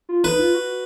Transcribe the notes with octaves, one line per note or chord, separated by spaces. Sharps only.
F4
D#4 B4
F4
F#4